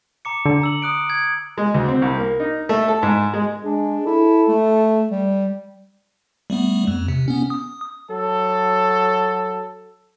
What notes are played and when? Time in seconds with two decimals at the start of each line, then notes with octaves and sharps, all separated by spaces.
0.25 A#5 D6 C#7
0.45 D3
0.61 A#5 E6 F#7
0.82 D#6 F#6 D7
1.10 G#6
1.58 G#3
1.74 D2
1.88 C4
2.02 C2
2.18 A#3
2.40 D#4
2.69 A3
2.88 A4
3.03 G#2
3.34 G#3
3.64 G#3 D4
4.06 E4 A4
4.48 A3
5.11 G3
6.50 G3 A3 B3
6.87 F2
7.08 C3
7.28 B3 C#4
7.50 D#6
8.10 F#3 A4